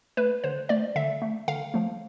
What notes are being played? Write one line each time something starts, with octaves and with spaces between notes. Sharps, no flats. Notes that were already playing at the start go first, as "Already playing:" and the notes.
A3 B4
D3 C5
A3 D5
D3 E5
A3
D3 F5
F3 A3